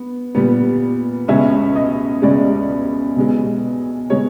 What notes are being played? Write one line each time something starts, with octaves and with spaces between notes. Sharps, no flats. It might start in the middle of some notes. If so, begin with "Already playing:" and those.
Already playing: B3
A#2 G3 B3
C#2 B2 G#3 C#4 E5
D#5
C#2 B2 G#3 C#4 D5
B1 B2 G#3
B2 G#3 C#5